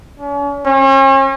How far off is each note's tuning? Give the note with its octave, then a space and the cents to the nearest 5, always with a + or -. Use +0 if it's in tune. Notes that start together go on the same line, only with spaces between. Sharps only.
C#4 +40
C#4 -40